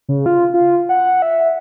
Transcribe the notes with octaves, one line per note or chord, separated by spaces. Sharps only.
C#3
F4
F4
F#5
E5